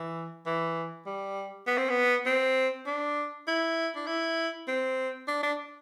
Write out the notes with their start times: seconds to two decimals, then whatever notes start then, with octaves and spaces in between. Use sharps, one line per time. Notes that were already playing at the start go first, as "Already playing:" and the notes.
Already playing: E3
0.46 E3
1.06 G3
1.67 B3
1.78 C4
1.90 B3
2.26 C4
2.86 D4
3.48 E4
3.96 D4
4.07 E4
4.68 C4
5.28 D4
5.43 D4